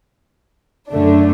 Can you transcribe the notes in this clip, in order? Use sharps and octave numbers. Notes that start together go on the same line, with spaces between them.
F#2 D3 A3 D4